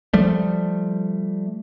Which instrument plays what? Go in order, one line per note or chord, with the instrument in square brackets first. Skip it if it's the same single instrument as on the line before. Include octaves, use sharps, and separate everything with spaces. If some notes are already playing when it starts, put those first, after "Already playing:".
[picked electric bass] F3 G3 A3